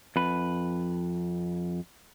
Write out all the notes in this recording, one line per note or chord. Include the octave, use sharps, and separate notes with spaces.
F2 B4